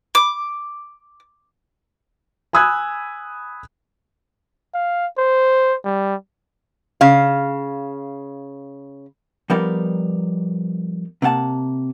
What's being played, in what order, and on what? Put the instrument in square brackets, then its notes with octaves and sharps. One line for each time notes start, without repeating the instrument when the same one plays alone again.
[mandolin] D6
[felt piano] G#5 B5 D#6 E6 F#6 G#6
[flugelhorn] F5
C5
G3
[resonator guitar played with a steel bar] C#3 F5
[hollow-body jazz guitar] F3 G3 B3 D#4 A#4 D5
C3 A#3 F#5 A5